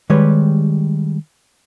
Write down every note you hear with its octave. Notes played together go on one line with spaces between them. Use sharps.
D#3 G3 G#3 G4 B4 C#5